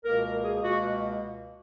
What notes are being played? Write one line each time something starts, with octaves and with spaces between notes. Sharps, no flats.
C#2 B2 A#3 A#4
A#4
G#4
C#2 B2 A#3 F#4